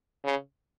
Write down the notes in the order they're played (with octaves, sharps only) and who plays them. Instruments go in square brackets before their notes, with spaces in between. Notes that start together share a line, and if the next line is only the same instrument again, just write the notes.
[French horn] C#3